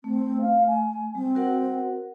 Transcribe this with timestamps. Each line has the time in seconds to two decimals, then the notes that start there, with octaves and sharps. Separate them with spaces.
0.04 A3 C4
0.42 F5
0.67 G#5
1.15 G3 C4
1.35 F#4 A#4 F#5